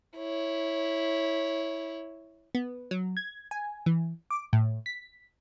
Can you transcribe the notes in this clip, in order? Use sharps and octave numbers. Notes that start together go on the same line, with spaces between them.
E4 C#5
B3
F#3
G#6
G#5
E3
D6
A2
B6